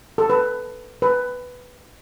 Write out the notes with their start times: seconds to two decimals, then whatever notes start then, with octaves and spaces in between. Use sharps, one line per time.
0.18 A4
0.30 B4
1.02 B4